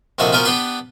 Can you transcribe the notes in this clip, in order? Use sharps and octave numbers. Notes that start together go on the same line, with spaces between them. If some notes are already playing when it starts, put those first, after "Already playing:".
A#1 C3 D#3 F#4 A4 F5
B3 C#4 F4 F#4 A#4 C5
B3 D4 G4 B4 C6